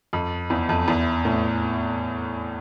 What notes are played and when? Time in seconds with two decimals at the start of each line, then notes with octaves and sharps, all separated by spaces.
0.13 F2
0.50 E2
0.69 F2
0.88 E2
1.25 A2